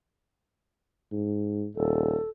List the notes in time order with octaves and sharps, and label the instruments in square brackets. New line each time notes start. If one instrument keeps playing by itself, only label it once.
[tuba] G#2
[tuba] D#1 [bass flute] A4